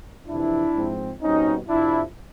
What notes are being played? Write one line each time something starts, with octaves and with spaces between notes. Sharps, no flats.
F2 C3 E3 D4 E4
G#2 F3 G#3 C4
B2 G3 C4 C#4 D#4
F2 C3 F3 D4 E4